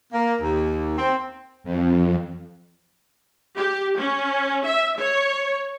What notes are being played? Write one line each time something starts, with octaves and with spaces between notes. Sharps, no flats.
A#3
D#2
C4
F2
G4
C#4
E5
C#5